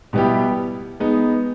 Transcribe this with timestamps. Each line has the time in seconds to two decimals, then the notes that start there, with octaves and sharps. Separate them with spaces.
0.13 B2 G3 B3 E4 G4
1.00 G#3 B3 D#4